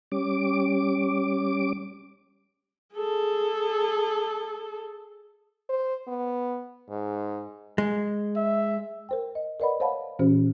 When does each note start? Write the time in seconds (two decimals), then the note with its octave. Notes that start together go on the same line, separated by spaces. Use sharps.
0.12 G3 C#4 D6
2.95 G#4 A4
5.70 C5
6.08 B3
6.90 G#2
7.78 G#3
8.36 E5
9.09 A#4 C5 G5
9.35 D#5
9.60 A#4 B4 D5 D#5 F#5 B5
9.80 C5 C#5 F5 F#5 A5 B5
10.19 A#2 E3 C#4 F#4 C5